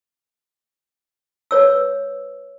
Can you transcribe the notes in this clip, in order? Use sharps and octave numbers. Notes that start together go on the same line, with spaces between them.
B4 C#5 E6